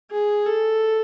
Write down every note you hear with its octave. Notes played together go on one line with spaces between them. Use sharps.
G#4
A4